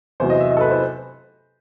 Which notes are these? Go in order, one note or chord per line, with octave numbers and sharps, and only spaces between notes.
E2 C3 F#3 C5
D#5
E5
D#5
A4
B4
C5